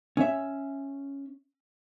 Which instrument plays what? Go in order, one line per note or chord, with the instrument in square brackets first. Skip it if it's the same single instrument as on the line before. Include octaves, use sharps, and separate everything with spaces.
[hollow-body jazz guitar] C#4 E5